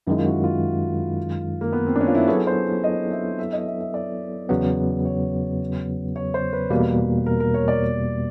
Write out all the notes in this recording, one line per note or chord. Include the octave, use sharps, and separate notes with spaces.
F#2 D#3 G#3 E4
F4
F#4
F4
A#3
B3
C4
D4
C#4
F4
E4
F#3 B3 E4 G#4 A4 C#5
C5
D#5
E5
E5
D#5
E5
E5
D5
E2 C#3 F#3 B3
C#5
C#5
C5
B4
E2 B2 G3 A#3
A#4
A#4
C#5
D5